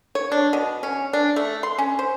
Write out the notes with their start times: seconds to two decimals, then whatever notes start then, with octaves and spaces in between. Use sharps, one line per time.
0.15 C#5
0.32 D4
0.53 B2
0.83 C#4
1.13 D4
1.36 A3
1.63 C6
1.78 C#4
1.99 C5